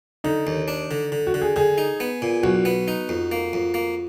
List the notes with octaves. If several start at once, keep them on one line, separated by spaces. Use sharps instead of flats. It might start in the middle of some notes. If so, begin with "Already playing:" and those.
D3 D#4
D#2
D4
D3
D3
F#4
D3
G#4
D3 G#4
D#4
B3
A#2
B1 F#4
B3
D#4
F2
A#3
F2
A#3